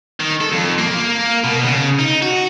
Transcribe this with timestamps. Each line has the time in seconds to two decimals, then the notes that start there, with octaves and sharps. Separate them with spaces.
0.20 D#3
0.41 A4
0.52 F2
0.78 A#3
1.44 B2
1.64 C#3
1.99 D#4
2.22 F#4